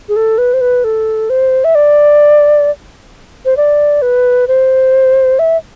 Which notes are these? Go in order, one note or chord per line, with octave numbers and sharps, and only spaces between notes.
G#4
A4
B4
C5
B4
A4
C5
E5
D5
C5
D5
B4
C5
E5